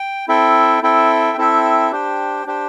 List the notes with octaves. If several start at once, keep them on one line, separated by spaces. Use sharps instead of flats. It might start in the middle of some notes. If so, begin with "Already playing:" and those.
Already playing: G5
C4 E4 A4 E5 G5
C4 E4 A4 E5 G5
C4 E4 A4 E5 G5
D4 G4 C5 G5
D4 G4 C5 G5